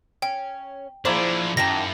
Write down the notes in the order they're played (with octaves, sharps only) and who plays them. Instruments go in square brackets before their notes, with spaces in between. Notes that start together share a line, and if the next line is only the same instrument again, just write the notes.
[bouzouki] C#4 [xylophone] G5
[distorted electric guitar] F3 D4 [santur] A#3 E4 G#4 [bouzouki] C5
[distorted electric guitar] C#2 F#2 [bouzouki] D#3 G5 A5 [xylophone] A#6